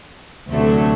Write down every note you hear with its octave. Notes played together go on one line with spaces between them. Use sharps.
D2 C3 F#3 A3 D4